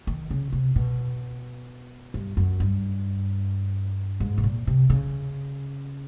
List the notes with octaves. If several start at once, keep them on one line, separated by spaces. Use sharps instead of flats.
D#3
C#3
C3
B2
G2
F#2
G2
G#2
B2
A#2
C3
C#3